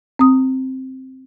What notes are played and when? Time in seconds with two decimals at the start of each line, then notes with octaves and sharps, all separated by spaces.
0.19 C4 D#6